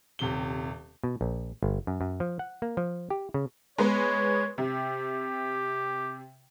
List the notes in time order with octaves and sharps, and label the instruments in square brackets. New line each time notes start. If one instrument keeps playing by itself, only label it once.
[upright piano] D#1 C3 G4 G7
[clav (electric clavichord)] B2
A#1
G1
F#2
F#2
F3
F#5
A#3
F3
G4
C#3
[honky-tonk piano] G#3 B3 B4 [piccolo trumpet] C#5
[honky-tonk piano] C3 [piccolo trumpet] G4